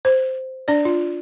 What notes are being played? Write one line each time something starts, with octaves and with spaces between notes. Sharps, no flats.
C5
D4 D5
F4